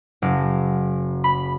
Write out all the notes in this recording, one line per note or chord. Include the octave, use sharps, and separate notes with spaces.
F#1
B5